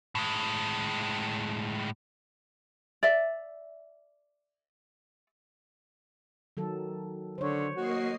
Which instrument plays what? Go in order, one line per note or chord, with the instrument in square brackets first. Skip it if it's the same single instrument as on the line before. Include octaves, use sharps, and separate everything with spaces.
[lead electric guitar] A2 G#3
[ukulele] D5 E5
[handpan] D#3 F#3 A4
[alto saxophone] D3 [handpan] C5 C#5
[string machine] A#3 D#5 C7 [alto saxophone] F#4